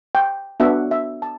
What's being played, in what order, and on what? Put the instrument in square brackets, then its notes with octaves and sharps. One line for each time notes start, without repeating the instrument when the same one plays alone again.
[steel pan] G5
B3 D4 F#4 E5
E5
A5